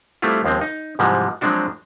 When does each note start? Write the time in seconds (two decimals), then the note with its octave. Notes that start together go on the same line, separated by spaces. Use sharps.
0.22 G3 A3 B3 C4 E4 F4
0.45 D#2 F3 G#3 C4
0.61 D#4
0.99 G#2 C3 E3 F3 G3 G#3
1.41 F3 F#3 G#3 C4 D4 F#4